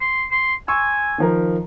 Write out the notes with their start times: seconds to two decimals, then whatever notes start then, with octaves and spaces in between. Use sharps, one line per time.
0.01 C6
0.31 C6
0.68 G#5 C6 C#6 E6
1.18 D#3 F3 A#4